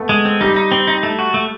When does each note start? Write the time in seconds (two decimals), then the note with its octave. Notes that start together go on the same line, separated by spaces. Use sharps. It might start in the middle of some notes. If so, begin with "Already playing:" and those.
Already playing: A3 B3
0.09 G#3
0.25 C4
0.41 G3 D#4
0.56 D#4
0.72 C4
0.87 D#4
1.03 A3
1.19 F#4
1.34 A3